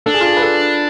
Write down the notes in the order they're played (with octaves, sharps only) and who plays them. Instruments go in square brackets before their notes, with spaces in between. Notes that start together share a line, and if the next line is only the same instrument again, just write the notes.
[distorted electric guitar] D4 [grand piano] A4
[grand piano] G#4
F4
G#4
B4
A4